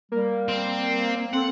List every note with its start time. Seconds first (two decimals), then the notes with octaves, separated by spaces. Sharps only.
0.12 G3 A#3
0.48 C4
1.33 C4 A4 F#5